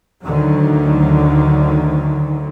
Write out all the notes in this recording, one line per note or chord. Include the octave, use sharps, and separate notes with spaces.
D2 D3 D#3 F#3